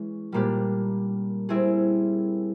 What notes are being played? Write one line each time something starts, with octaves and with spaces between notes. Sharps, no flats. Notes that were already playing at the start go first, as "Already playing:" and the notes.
Already playing: E3 G#3 C#4
A#2 G3 A#3 D4 G4
G3 C4 E4 G#4